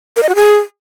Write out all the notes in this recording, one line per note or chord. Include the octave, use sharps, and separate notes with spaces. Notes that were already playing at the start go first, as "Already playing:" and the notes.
A#4
D#5
F#4
G#4